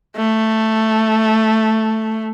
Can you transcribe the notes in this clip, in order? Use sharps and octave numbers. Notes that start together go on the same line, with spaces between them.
A3